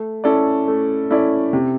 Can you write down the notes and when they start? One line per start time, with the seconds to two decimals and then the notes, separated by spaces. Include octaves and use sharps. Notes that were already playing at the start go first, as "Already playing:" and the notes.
Already playing: A3
0.24 C#4 E4 A4 D5
0.68 A3
1.11 C#4 E4 A4 D5
1.53 C3